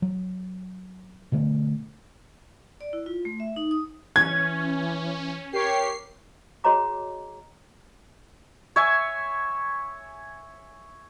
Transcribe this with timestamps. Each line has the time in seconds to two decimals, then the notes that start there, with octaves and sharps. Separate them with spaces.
0.02 F#3
1.32 B2 D3 A3
2.81 D5
2.93 E4
3.06 F4
3.25 A3
3.40 E5
3.56 D#4
3.71 D#6
4.16 E3 C#4 G#6
5.53 G4 A#4 C#5 C7
6.64 F#4 G#4 C#5 D#5 A#5 D6
8.76 C#5 E5 G#5